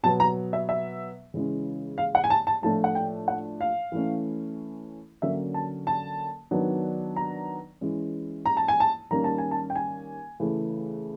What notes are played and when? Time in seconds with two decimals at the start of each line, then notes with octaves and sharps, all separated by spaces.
0.03 B2 F#3 B3 A5
0.20 A#5
0.53 E5
0.69 E5
1.34 C#3 E3 G#3 C#4
1.98 F5
2.15 F#5
2.24 G#5
2.30 A5
2.47 A5
2.62 A2 F3 A3 D4 A5
2.84 F#5
2.95 G5
3.28 F#5
3.61 F5
3.92 E3 A3 C#4
5.22 D3 F#3 A#3 C#4 E5
5.54 A5
5.87 A5
6.51 D#3 F#3 B3 D4
7.16 A#5
7.81 E3 G#3 C#4
8.46 A#5
8.57 A5
8.68 G#5
8.80 A5
9.11 D#3 G3 A#3 C#4 A#5
9.24 A5
9.38 G#5
9.51 A5
9.70 G5
9.76 G#5
10.40 C#3 E3 A3